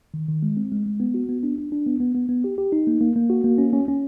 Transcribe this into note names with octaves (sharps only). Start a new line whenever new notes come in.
D#3
D#3
G#3
C4
G#3
G#3
B3
F#4
B3
D4
D4
D4
B3
B3
B3
B3
G4
G4
D#4
A#3
A#3
A#3
F#4
A#3
C#4
C#4
C#4